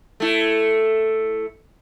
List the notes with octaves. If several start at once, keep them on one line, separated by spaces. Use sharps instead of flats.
A3 E4